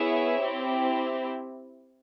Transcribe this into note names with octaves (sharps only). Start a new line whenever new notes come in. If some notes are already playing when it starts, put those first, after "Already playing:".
Already playing: B3 E4 G#4 C#5 E5
C4 E4 G4